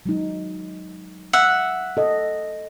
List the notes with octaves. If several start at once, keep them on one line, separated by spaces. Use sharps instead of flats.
F#3 G#3 D#4
E5 F#5
A4 D#5